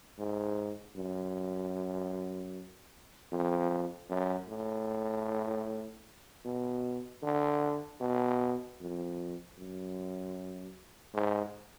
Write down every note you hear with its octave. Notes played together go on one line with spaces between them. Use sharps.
G#2
F#2
F2
F#2
A2
B2
D3
B2
F2
F#2
G#2